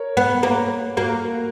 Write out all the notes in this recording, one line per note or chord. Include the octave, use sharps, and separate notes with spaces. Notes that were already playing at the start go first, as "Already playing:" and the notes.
Already playing: A#4 C#5
B3
A#3
A#3 F#4 A#4